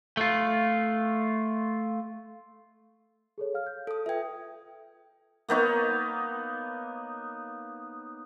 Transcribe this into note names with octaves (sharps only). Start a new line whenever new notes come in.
A3 F4
G#4 A4 C#5
F5 F6
G6
A4 D#6
F4 B4 E5 G5 G#6
A#3 B3 D#4 C#5